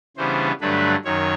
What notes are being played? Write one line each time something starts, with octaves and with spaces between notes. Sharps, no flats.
C#3 E3 G3 B3 D4 C5
G2 D3 F#3 A3 D4 B4
F#2 D#3 C#5